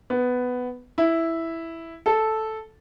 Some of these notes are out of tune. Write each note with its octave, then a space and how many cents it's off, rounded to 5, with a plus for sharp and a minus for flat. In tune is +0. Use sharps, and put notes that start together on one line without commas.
B3 +10
E4 +0
A4 -5